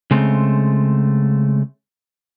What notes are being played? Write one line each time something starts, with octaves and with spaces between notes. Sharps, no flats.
C#3 G#3 A3 C4